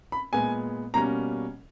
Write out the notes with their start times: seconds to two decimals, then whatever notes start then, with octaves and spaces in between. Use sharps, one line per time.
0.12 B5
0.33 A#2 G#3 B3 G#5
0.94 B2 G3 A#3 C#4 A#5